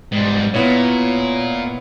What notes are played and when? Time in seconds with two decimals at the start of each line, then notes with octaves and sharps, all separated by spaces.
0.12 G#2 G3
0.54 A#2 B3 E4 C#5